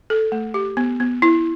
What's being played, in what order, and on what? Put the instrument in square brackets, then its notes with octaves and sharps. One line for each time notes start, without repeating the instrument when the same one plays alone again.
[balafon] A4
A3
G4
B3
B3
E4